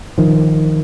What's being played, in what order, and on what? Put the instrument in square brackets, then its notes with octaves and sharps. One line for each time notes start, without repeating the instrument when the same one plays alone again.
[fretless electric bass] D#3 F3